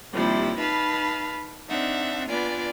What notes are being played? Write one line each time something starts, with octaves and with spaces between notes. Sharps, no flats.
D#2 C3 F3 G3 E4
D#4 B4 F5 A5 B5
C4 D4 D#4 E5 F#5
B3 D4 F4 D5 G#5